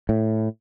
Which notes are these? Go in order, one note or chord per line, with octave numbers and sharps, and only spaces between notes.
A2